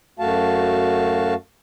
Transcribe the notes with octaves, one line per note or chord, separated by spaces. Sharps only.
F#2 A3 F#4 F5 A5